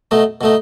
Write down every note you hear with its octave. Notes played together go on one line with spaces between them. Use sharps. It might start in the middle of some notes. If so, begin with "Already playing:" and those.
B2 A3 D#4
B2 A3 D#4